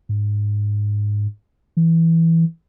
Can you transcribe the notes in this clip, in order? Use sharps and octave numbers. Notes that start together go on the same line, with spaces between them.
G#2
E3